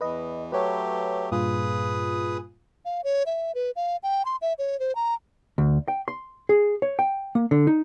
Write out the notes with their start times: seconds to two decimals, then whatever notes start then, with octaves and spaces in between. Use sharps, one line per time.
0.01 E2 E3 B4 D#5
0.52 F#3 A3 G4 B4 C#5
1.32 G2 A#2 F4 G#4 B4 D#6
2.85 F5
3.04 C#5
3.26 E5
3.55 B4
3.76 F5
4.03 G5
4.25 C6
4.42 E5
4.59 C#5
4.80 C5
4.95 A#5
5.58 D2
5.88 G5
6.08 C6
6.49 G#4
6.82 C#5
6.99 G5
7.35 A#3
7.51 D3
7.67 D#4